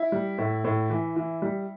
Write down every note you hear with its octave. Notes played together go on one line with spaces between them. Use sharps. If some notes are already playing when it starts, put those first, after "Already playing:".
Already playing: E4
G3
A2
A2
E3
E3
G3